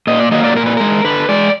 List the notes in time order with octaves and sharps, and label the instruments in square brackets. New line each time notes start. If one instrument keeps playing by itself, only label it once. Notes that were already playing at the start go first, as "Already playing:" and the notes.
[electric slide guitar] A#2 D#5
D5
F#3 A#3 D#5
D5
A#2 A#4
B4
G#3 A#4
D3 B4
G#3 D5